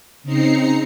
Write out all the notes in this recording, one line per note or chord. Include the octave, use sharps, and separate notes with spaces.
C#3 C4 D#4 A#5 C7 C#7